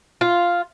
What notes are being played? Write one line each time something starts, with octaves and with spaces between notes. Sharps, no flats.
F4